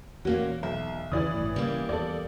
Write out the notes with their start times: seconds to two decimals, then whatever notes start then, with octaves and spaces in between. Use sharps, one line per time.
0.25 E2 A#2 A#3 C#4 F#4
0.63 B1 E5
1.12 E2 C#3 E3 D5 D#6
1.34 G1 A2
1.56 C#3 G3 A#3
1.89 E2 A4 D5